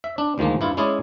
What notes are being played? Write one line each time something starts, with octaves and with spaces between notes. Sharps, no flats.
E5
D4
D2 D#3 F3 G#3 A#3
G2 E4 F4
G#3 C#4 E4 G#4 C#5 D5